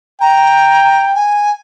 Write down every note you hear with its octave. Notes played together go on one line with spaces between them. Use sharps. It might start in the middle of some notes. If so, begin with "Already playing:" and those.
G5 A#5
G#5